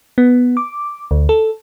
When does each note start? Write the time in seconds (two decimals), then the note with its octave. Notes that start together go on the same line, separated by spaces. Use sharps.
0.18 B3
0.57 D6
1.11 D2
1.29 A4